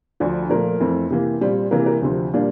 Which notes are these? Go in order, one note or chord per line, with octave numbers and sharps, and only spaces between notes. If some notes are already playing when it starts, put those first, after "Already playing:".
D2 D3 F3
A#2 F3 A3 A#4
F2 E3 A3 C4
C3 E3 A#3
A#2 G3 C4
C3 E3 A#3 A#4
A#4
D2 C3 F3 C4
A#2 G3 A#3 D4